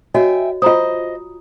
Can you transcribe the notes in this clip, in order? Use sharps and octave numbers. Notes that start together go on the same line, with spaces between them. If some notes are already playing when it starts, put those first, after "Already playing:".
F#4 C#5 D#5 E5 G5 G#5
F4 C5 D#5 A#5 D#6